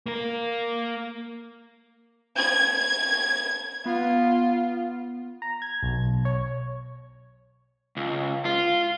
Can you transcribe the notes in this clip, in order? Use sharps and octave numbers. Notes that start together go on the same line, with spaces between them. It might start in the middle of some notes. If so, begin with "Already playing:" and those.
A#3 A#4
G#6
B3 F4
A#5
G#6
B1
C#5
C#2
F4